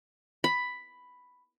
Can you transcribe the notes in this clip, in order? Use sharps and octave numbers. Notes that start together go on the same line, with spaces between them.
B5